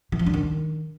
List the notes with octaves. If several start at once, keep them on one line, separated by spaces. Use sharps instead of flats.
E3
F3
D4
D#3